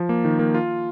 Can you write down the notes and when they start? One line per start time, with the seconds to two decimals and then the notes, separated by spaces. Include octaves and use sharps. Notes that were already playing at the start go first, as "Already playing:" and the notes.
Already playing: F3
0.09 A#3
0.25 D#3
0.39 A#3
0.54 F4